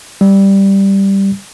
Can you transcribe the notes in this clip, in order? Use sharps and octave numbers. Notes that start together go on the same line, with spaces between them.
G3